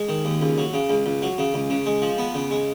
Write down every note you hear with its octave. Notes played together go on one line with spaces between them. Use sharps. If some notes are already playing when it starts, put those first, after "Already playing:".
Already playing: G#3
D#3
D#2
C#2
F#3
C#3
C#2
C#2
F#3
C#3
C#2
C#3
G#3
F3
B3
C#3
G#3